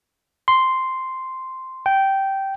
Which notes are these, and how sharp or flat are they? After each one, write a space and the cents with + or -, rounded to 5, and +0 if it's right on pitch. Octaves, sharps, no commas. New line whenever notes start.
C6 -5
G5 -10